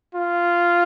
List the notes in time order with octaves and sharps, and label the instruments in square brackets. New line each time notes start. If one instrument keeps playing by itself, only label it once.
[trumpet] F4